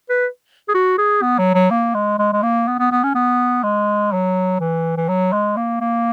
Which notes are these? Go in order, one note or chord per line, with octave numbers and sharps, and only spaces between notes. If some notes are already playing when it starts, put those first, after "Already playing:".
B4
G#4
F#4
G#4
B3
F#3
F#3
A#3
G#3
G#3
G#3
A#3
B3
B3
B3
C#4
B3
G#3
F#3
E3
E3
F#3
G#3
A#3
A#3